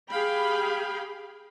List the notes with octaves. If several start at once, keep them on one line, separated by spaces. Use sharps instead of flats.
G4 G#4 F5 G5 B5